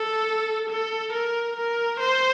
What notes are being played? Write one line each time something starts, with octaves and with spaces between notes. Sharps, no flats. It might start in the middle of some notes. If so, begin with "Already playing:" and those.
Already playing: A4
A4
A#4
A#4
C5